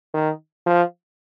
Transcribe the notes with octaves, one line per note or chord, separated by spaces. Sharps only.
D#3
F3